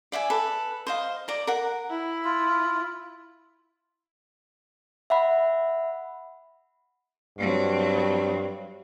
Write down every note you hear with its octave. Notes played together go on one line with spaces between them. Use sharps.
D5 E5 F#5 G#5
A4 B4
C5 D#5 F5
D5 A#5
A#4 F#5
E4
F4
E5 F#5 B5
G2 F#3 C4